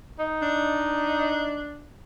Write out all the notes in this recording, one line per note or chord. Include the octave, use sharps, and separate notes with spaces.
D#4
D4